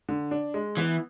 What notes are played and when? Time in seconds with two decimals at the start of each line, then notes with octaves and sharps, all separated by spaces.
0.09 D3
0.31 D4
0.54 G#3
0.77 E3 B3